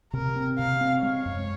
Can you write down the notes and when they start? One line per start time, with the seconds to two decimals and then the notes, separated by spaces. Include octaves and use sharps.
0.13 C3 A#4
0.36 C4
0.59 C3 F5
0.81 C4
1.02 G#3 C#5
1.26 F#2